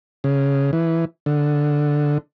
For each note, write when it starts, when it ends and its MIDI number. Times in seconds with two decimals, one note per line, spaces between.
0.24 0.71 49
0.73 1.05 52
1.26 2.18 50